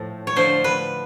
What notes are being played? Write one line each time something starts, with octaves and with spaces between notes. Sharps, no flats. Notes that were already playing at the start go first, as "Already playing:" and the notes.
Already playing: A2 F3 A3
C#5
D3 F3 A3 C5
B4